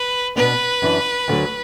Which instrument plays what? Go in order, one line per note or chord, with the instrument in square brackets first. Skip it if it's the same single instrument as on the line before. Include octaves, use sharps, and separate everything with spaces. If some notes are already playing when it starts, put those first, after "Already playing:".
Already playing: [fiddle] B4
[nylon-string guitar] B2 B3 D4 [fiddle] B4
[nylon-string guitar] F#2 E3 D4
D2 D3 F#3